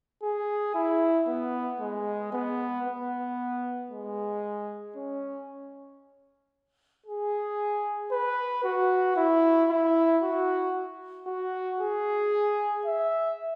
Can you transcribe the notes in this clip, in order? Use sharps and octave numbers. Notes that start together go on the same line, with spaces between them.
G#4
E4
B3
G#3
B3
B3
G#3
C#4
G#4
B4
F#4
E4
E4
F#4
F#4
G#4
E5